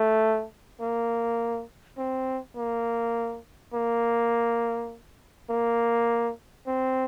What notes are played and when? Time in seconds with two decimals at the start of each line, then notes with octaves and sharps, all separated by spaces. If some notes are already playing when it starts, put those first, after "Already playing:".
Already playing: A3
0.81 A#3
1.98 C4
2.57 A#3
3.74 A#3
5.50 A#3
6.67 C4